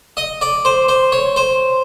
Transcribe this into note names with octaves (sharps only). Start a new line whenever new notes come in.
D#5
D5
C5
C5
C#5
C5